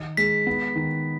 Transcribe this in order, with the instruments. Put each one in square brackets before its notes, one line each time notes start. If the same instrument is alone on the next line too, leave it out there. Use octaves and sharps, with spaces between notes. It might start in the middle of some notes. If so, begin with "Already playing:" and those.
Already playing: [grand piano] D#3 D#4
[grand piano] G#3 [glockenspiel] B6
[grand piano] B3
D#3